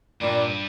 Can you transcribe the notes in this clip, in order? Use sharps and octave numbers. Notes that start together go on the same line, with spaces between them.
G2 A#2 G3 D4